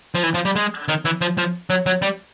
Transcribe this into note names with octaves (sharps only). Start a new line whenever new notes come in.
F3
E3
F3
G3
G#3
D#3
E3
F3
F3
F#3
F#3
G3